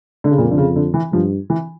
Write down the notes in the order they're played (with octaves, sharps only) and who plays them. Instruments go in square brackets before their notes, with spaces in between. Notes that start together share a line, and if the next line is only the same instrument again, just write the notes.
[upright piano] D3
C#3
[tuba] F2 [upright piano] A#2
[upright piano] D3
C#3
D3
E3
[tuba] G2 [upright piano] F3
[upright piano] E3